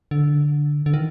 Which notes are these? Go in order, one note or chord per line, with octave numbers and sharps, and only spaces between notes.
D3
D3
D#3